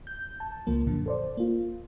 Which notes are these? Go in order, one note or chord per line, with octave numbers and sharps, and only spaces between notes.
G6
A5
C#2 F3 A#3
F#2 A#2 D3
A4 C5 D5
A#3 F4